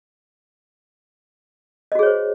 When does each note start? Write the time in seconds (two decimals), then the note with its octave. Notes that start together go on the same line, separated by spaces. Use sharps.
1.92 D#5
1.95 F#4
1.99 G#4
2.03 C#5
2.06 C5